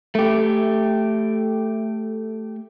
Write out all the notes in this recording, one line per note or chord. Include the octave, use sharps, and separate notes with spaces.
A3 G4